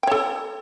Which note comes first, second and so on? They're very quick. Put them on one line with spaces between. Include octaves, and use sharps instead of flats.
G5 C#5 A4